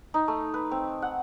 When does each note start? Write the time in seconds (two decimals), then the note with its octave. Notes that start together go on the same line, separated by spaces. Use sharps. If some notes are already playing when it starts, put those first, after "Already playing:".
0.14 D#4
0.28 A3
0.54 B4
0.71 C4
1.02 F#5